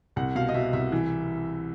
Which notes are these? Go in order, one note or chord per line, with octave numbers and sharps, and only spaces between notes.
C2 F#5
B2 F5
D#5
B2 E5
C2 E5
E3